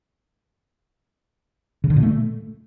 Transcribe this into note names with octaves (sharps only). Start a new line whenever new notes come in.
C#3
D3
A#2
A3